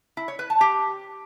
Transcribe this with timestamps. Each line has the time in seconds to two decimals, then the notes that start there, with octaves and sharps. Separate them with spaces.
0.17 E4
0.28 C#5
0.39 B4
0.50 A5
0.61 G4